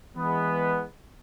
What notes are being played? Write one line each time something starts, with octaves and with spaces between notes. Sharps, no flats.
E3 G#3 B3